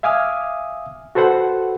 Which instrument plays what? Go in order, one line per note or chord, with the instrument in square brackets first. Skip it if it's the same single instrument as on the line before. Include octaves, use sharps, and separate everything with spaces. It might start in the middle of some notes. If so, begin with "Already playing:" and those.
[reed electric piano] E5 F5 G#5 D6 D#6 F6
F#4 A4 B4 C5 F#5